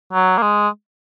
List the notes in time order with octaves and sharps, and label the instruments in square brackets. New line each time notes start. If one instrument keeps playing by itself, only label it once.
[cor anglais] F#3
A#3
G#3